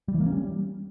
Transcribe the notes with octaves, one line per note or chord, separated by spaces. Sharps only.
G3
E3
A#3
C#4
G3